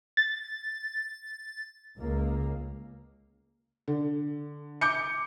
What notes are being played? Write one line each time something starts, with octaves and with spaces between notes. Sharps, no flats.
A6
C#2 A#3
D3
D6 G6 C#7